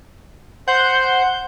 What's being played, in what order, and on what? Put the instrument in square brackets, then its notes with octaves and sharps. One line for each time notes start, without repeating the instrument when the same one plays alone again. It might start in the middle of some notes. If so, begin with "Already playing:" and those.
[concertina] C5 [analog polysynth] F#5 G6